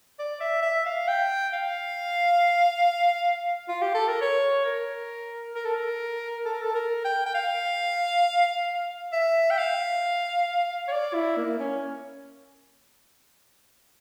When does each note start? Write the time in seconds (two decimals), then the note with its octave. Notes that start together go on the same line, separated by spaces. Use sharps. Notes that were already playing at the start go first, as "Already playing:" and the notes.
0.19 D5
0.41 E5
0.63 E5
0.86 F5
1.08 G5
1.53 F5
3.68 F4
3.82 G4
3.94 A4
4.08 A#4
4.21 C#5
4.66 A#4
5.55 A#4
5.65 A4
5.74 A#4
6.45 A4
6.54 A#4
6.62 A4
6.75 A#4
7.05 G5
7.26 G5
7.35 F5
9.13 E5
9.51 G5
9.58 F5
10.88 C#5
10.92 D5
11.14 E4
11.37 A#3
11.59 C#4